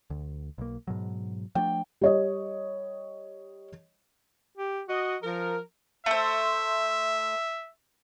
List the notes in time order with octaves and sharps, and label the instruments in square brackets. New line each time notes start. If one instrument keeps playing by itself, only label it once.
[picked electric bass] D2
B1 A#3
G#2 B2 F#3
[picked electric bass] F3 A3 D4 [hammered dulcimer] G5
[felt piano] G3 C#5 D#5
[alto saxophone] G4
[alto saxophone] F#4 [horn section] D#5
[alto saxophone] F3 [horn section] A#4
[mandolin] A3 C5 [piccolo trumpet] E5